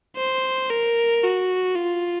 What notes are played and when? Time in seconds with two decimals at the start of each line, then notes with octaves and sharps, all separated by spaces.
0.16 C5
0.70 A#4
1.23 F#4
1.76 F4